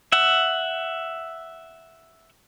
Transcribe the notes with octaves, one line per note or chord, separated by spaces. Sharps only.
E5 F#5